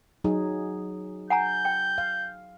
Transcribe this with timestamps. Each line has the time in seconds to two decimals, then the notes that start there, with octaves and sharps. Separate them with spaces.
0.24 F#3 D#4 G#4
1.30 F#5 G#5 A#5 G6
1.65 G5
1.98 F5